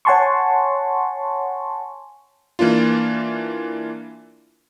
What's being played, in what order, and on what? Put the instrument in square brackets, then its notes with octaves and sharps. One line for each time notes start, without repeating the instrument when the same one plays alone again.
[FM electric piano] C#5 F#5 G#5 A5 C6 C#6
[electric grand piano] E3 A#3 D4 F4